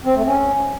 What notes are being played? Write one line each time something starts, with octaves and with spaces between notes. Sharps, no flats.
C4
A3
C#4